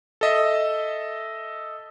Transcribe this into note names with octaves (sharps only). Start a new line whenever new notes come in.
A4 D#5 E5